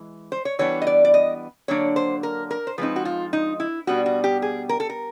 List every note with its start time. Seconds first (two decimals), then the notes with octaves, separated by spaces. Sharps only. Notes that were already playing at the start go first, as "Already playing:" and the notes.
Already playing: E3 G#3
0.32 C5
0.45 C#5
0.59 E3 G3 B3 D4 C#5
0.82 D#5
0.87 D5
1.05 D5
1.14 D#5
1.68 D3 F#3 A#3 D4 C#5
1.96 C5
2.23 A#4
2.51 A#4
2.67 C5
2.78 F3 G#3 C4 D#4 B4
2.96 F#4
3.05 F4
3.33 D#4
3.60 E4
3.87 B2 G3 B3 D4 F#4
4.06 F#4
4.24 G4
4.42 G#4
4.69 A#4
4.80 A4
4.90 A#4